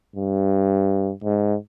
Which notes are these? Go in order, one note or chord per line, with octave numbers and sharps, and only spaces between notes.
G2
G#2